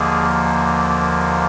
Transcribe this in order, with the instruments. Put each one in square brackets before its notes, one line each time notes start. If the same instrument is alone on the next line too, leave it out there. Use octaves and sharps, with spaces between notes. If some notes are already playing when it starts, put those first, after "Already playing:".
Already playing: [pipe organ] D#2 D3 F3 A#3 G#4